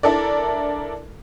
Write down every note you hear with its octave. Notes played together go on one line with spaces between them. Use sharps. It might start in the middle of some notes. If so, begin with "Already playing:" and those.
D4 E4 A4 A#4 D5